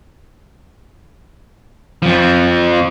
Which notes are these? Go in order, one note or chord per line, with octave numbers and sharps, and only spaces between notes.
F2 F3